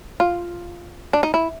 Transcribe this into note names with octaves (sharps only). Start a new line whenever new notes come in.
F4
D4
D#4
E4